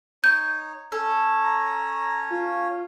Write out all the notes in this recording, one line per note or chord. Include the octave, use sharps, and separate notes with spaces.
D#4 C#5 G6
C#4 A4 C#5
A#5
F4